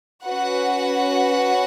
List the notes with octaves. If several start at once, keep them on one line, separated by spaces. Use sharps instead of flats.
C#4 F#4 B4 F#5